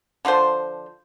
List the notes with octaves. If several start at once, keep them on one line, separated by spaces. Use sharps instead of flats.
D3 F3 F4 C5